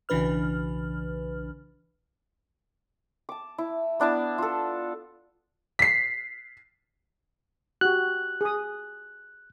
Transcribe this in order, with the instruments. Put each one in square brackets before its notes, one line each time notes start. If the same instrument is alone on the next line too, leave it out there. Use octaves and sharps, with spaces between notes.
[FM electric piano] B1 C#3 E3 D4 B4 F6
[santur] A5 D6
E4
B3 D4 E4 A5
F4 A4
[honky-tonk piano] B6 C7
[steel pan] F#4 G4 [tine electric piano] F#6
[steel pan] G#4 D#6